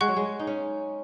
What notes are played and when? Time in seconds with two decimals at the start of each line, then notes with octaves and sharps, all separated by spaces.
0.01 G#3 F#5 C#6 F#6
0.08 F#3
0.17 G#3
0.40 D#4
0.47 C#4